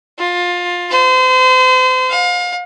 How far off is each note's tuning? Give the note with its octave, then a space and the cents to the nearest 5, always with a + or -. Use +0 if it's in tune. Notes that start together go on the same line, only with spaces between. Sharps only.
F4 +20
C5 -35
F5 +35